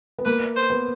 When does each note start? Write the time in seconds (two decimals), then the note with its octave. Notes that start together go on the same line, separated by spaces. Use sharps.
0.18 B3
0.25 A#3 B4
0.56 C5
0.70 B3